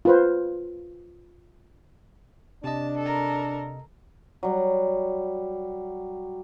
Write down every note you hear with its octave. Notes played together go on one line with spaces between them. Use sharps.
F4 B4 C5
C3 D4 D#5 A5
A4 A#4
F#3 G3